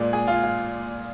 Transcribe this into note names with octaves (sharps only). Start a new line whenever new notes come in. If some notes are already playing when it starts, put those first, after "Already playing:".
Already playing: A#2 G#3 D5
G#4
F4
F4